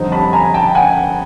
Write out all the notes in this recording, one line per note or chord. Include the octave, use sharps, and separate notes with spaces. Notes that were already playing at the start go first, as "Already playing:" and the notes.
Already playing: F2 D3 G3 C4 D#4
A5 B5
G#5 A#5
G5 A5
F#5 G#5